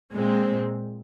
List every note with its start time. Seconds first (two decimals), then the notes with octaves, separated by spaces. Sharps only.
0.14 A#2 G#3 C4